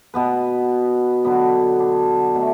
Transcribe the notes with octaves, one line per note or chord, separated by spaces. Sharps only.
B2 B3 B4
D3 F#3 B3
D4
B2 F#3 A3